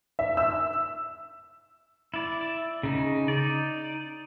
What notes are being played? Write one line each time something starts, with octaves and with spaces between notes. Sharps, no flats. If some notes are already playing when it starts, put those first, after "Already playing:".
E5
E6
E4 D5
C#3 D#4
D#4 D5